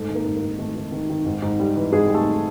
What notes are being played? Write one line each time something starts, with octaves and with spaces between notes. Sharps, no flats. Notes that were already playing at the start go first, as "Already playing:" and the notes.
Already playing: G#2 A3 A4
D#3
A#3 A#4
G#2
A#3 A#4
G#2
D#3 A3 A4
D#3
D#3
D#3
G#2
G#2
G3
E3
G#2 G#3 G#4
G3
A3 A4